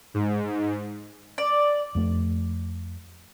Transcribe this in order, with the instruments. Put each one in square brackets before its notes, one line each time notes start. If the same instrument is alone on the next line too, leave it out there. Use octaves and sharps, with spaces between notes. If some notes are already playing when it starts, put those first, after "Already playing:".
[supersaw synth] G#2
[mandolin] D5
[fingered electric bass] F2 A3